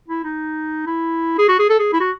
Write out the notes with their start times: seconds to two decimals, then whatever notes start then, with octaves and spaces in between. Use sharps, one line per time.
0.08 E4
0.24 D#4
0.87 E4
1.38 G#4
1.49 F#4
1.59 G#4
1.69 A4
1.79 G#4
1.93 E4
2.01 F#4